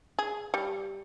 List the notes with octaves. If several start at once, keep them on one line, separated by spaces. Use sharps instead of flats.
G#4
G3